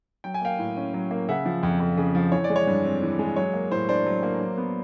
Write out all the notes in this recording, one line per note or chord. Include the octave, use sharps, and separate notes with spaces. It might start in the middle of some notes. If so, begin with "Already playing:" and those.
F#3 G5
G#5
A#3 F5 G5
A2
C#4
F#3
A#3
C#3 E5 F#5
F3
F2
F2
C#3
F3
E3 C#5
D5
G#3
C#5
G2
C4
E3
G#3
F#3 C#5
A#3
A2 C5
D4 C5 D5
F#3
A#3
F#3
B3